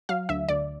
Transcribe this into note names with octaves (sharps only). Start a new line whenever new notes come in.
F#3 F5
D2 E5
D2 D5